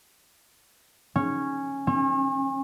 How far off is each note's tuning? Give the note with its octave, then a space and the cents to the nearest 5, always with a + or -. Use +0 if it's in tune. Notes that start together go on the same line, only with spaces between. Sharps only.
C#4 -10
C#4 -40